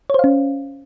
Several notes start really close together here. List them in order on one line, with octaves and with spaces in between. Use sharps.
C#5 C5 F5 C#4